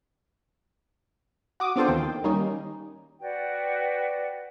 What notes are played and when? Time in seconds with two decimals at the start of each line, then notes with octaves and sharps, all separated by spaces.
1.60 F#4 D6 D#6
1.76 B3 C4 D4 F4 A4 C5
1.88 D#2 D#3 G5
2.24 D#3 G3 A#3 C#4 D#4
3.20 F#4 B4 D5 G5